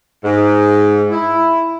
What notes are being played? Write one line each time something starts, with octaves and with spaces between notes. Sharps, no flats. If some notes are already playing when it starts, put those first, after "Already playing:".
G#2
E4